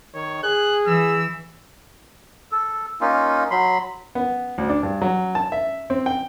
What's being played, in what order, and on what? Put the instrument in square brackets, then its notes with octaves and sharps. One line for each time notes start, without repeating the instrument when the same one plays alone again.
[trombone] D#3 [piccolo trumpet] C#5
[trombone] G#4 [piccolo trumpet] F#6
[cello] E3 [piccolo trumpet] E6
[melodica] A4
A#3 C#4 D#4 F4
F#3 B5 C6
[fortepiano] B3
D2
D4
G2
F#3
A5
E5
C4
G5